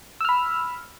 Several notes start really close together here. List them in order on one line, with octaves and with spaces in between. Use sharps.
E6 F6 B5